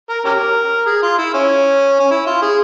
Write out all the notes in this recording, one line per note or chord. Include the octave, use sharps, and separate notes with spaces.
A#4
C#4 G4 A#4
G#4
F4
E4
C#4
C#4
E4
F4
G#4